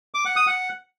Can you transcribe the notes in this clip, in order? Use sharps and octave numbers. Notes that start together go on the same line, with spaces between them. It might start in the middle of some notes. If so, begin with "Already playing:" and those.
D6
F#5
D#6
F#5